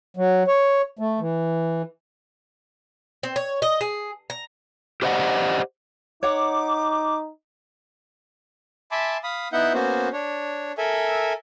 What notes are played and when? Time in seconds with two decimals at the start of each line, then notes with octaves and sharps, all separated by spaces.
0.17 F#3
0.47 C#5
0.99 A3
1.20 E3
3.23 C4
3.36 C#5
3.62 D#5
3.81 G#4
4.30 A#5
5.02 G4 C5 D5 D#5 F#5
6.23 D#4 C#5 F#5 D6
8.91 E5 G#5 A5 B5 C6 D6
9.23 F5 B5 D#6
9.53 B3 D#4 E4 E5 F#5 G6
9.73 A#3 B3 C#4 F#4 C5
10.13 D4 C#5
10.78 A4 A#4 E5 G#5